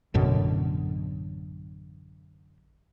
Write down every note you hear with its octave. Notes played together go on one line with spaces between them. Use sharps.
A1 F#2 B2 D3